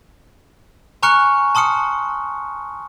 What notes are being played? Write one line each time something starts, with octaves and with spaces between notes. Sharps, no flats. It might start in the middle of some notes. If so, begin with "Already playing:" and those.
G#5 A#5 C#6 F6 F#6 C#7
A5 C6 D#6 F6 C#7